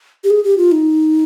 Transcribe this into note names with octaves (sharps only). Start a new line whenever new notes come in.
G4
G#4
G4
F4
D#4